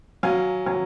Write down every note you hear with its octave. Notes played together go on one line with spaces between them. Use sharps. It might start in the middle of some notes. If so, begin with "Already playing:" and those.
F#3 F5 G#5
F#3